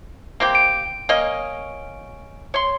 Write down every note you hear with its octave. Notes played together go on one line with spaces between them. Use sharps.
A#3 C4 G4
D7
A#3 C#4 D#5
C#5 C6